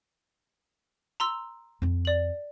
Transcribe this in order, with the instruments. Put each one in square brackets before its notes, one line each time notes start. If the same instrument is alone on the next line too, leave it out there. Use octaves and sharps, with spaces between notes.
[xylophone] A#5 C6 E6
[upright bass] F2 C4
[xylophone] D5 F#7